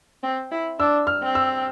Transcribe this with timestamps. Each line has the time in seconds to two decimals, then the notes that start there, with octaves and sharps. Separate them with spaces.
0.23 C4
0.51 E4
0.79 D4 E6
1.07 F6
1.22 C4
1.35 E6